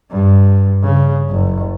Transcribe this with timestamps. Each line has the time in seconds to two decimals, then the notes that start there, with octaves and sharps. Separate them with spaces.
0.11 G2
0.83 C#3
1.30 F#1